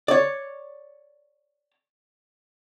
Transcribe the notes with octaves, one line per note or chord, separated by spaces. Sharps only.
C#5 D5